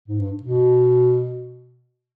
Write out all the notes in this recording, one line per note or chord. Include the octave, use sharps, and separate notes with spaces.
G#2
G2
B2